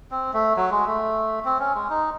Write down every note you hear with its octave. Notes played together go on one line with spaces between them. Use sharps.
C4
A3
F#3
G#3
A3
C4
C#4
G#3
D#4